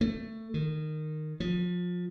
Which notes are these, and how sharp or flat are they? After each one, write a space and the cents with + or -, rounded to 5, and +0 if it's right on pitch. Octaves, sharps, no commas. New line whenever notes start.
A3 +15
D#3 -15
F3 +25